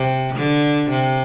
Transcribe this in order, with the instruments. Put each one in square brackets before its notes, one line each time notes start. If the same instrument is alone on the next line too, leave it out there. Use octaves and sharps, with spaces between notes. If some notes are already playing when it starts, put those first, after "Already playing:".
Already playing: [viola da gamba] C3
D3
C3